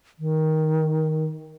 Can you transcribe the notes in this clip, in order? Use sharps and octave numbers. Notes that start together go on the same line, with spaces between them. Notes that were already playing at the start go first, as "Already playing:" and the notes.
D#3